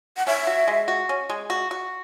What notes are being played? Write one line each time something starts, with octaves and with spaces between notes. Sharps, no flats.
F#5
C#4 E5
F#4
G#3
F#4
C#4
G#3
F#4
F#4